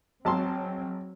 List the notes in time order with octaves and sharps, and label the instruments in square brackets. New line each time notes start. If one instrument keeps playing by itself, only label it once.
[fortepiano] G#1 A5 C6 [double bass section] F#3 C4